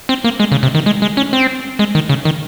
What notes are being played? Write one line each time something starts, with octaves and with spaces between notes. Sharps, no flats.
C4
A#3
G#3
C#3
C3
D#3
G#3
G#3
C#4
C4
G#3
D#3
C#3
D#3